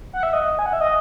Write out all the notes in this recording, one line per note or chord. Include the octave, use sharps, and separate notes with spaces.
F#5
E5
D#5
G#5
F#5
E5
D#5